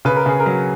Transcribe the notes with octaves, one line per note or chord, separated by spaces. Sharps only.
C#3 B4
A#4
C#3 G#4
A#4
F#3